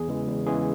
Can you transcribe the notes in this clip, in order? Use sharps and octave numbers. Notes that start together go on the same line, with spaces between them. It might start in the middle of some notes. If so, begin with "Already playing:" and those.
Already playing: E2 G#4
C#3 E3 G#3
E2
C#3 E3 G#3 G#4